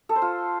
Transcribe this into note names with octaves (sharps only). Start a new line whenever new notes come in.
A4
C5
F4